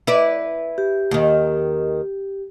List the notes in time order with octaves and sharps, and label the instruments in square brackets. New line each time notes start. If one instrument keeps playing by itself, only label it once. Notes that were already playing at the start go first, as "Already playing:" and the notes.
[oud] E4 B4 D5
[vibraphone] G4
[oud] D#2 D#3